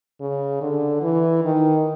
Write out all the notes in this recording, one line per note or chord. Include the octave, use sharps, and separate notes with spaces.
C#3
D3
E3
D#3